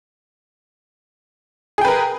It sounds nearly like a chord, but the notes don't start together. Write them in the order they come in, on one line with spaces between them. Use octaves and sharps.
G#4 G5 B4 A#4